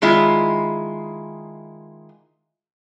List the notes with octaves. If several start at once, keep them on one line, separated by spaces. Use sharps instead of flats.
D#3 G#3 E4 F4